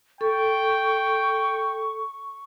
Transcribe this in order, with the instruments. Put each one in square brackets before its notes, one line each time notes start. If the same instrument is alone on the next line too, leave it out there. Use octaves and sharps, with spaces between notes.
[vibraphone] A4 [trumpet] G5 [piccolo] C#6